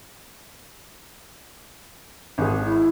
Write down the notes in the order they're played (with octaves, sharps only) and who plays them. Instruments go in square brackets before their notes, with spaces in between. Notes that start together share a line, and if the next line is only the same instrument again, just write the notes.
[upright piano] G#1 G#4
[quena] E4